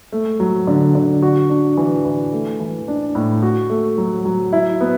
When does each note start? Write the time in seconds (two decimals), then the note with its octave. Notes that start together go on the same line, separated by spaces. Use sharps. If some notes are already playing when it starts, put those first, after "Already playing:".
0.12 A3
0.40 F#3
0.67 D3
0.95 D3
1.22 F#4
1.50 D4
1.77 E3
2.05 E3
2.33 A3
2.60 E3
2.88 D4
3.15 A2
3.43 F#4
3.70 A3
3.98 F#3
4.25 F#3
4.53 E4
4.81 B3